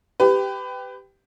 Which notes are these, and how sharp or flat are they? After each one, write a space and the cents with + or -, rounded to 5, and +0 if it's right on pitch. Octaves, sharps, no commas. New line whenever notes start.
G4 +0 B4 +25